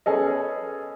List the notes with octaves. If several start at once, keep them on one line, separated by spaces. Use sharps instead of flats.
B3 C#4 G#4 A4 D#5